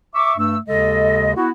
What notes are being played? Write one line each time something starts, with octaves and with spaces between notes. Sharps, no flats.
E5 C#6 D6
G2 A3 E6
D#2 C#3 G#3 A4 D#5
B3 E4 F#4